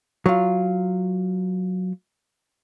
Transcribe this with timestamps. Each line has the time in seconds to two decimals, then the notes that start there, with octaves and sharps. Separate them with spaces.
0.26 F#3 F4